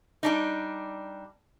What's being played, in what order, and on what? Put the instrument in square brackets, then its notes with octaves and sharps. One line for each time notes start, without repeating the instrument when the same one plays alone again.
[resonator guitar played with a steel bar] G3 D4 D#4